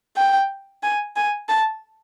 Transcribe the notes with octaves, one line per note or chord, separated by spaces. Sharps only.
G5
G#5
G#5
A5